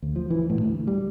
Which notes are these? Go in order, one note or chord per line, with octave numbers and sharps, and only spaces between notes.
D2
F3
E3
A2
D2
G3